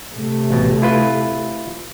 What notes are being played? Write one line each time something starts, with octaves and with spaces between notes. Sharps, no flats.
C3 A3
A1 B2
E4 F4 B4